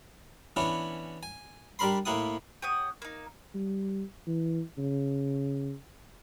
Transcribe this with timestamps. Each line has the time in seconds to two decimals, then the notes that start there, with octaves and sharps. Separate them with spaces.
0.56 E3 B3 C#4 D4 E4
1.23 G#5
1.79 G3 D4 A#4 B5 C6
2.05 A2 A#3 E4 F#5 D#6
2.62 G4 C#5 F#5 D#6
3.02 A#3 D#4
3.55 G3
4.27 E3
4.78 C#3